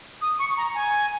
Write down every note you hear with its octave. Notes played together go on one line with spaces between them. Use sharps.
D#6
C#6
A#5
G#5